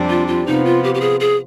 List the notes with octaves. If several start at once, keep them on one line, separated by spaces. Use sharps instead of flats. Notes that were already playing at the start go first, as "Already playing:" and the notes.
Already playing: F2 C3 G3 D4
F4
F4
C3 F3 B3 D#4
F4
G4
G4
G#4
G#4